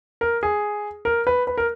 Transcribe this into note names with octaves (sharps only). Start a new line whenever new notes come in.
A#4
G#4
A#4
B4
B4
A#4